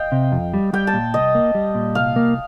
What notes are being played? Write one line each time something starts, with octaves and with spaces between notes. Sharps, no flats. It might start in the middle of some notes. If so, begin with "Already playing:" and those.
Already playing: D#5 F5 G5
C3
F2
G3
G3 G5
A5
A#2
C2 D#5
A#3
G3
A#2
C2 F5
A#3